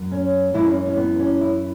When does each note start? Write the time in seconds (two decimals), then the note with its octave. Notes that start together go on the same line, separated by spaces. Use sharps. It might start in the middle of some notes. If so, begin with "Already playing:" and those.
Already playing: F#2 F#3
0.12 C#4
0.54 F#2 E3 G#3 E4
0.66 C#4
0.86 C#4
0.97 B3
1.19 C#4
1.41 E4